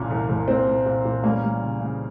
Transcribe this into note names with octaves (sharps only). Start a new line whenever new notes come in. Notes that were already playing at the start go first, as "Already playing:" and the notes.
Already playing: C2 A#2 A#3 C#4
C2
C2
A#2 C4
A#2
A#2
A#2
G3 A#3 C#4
G3
C#3
C#3